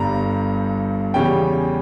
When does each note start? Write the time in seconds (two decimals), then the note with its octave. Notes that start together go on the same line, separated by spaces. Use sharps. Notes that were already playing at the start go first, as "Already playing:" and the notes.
Already playing: G1 G2 G3 A#5
1.14 E2 C#3 G3 C#4 G5